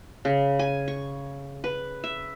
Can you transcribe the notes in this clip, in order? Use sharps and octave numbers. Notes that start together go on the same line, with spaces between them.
C#3
G#5
C#6
B4
E5